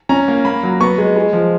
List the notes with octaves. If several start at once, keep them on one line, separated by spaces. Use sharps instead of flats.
C#4 A#5
A#3
A#3 B5
F#3
B3 C#6
G#3
G#3
F3